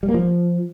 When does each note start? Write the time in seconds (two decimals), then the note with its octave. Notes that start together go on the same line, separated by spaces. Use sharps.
0.03 G3
0.09 A#3
0.14 F3